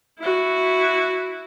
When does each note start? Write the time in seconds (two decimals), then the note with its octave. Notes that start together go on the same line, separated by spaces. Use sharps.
0.19 E4 F#4